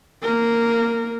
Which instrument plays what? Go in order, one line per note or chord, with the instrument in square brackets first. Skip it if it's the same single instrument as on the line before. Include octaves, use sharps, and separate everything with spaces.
[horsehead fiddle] A#3 A#4